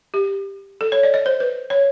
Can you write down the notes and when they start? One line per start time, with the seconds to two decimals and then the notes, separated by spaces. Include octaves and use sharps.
0.14 G4
0.81 A4
0.92 C#5
1.03 D5
1.14 D#5
1.26 C5
1.40 B4
1.70 C#5